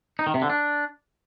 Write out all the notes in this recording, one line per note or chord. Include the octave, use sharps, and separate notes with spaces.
D#4
D#3
C3
D3
D4